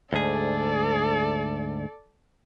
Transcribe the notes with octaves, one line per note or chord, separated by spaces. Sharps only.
D2 G#2 G#4 A4 D5